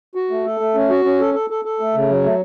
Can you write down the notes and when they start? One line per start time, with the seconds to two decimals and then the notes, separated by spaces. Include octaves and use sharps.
0.15 F#4
0.31 A3
0.45 A4
0.60 A3
0.75 C#4
0.90 F#4
1.04 C#4
1.20 A4
1.34 A4
1.50 A4
1.65 A4
1.80 A3
1.95 C#3
2.09 F#3
2.24 A3